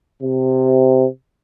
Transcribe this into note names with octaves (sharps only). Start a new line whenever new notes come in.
C3